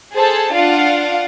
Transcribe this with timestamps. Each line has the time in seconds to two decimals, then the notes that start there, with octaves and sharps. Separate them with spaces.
0.15 G#4 A4 C5 A5
0.53 D4 F4 F5 F#5